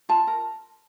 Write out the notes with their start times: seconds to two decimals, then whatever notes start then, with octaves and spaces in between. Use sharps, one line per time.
0.09 F4 A5
0.27 A#4